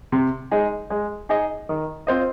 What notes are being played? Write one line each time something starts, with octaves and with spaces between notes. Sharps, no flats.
C3
G#3 D#4 G#4
G#3
D#4 G#4 D#5
D#3
C4 F4 C5 D#5